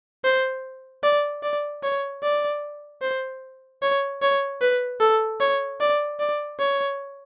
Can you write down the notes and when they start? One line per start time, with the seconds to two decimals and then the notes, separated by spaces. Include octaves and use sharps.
0.24 C5
1.03 D5
1.43 D5
1.83 C#5
2.23 D5
3.02 C5
3.82 C#5
4.22 C#5
4.61 B4
5.00 A4
5.40 C#5
5.80 D5
6.20 D5
6.59 C#5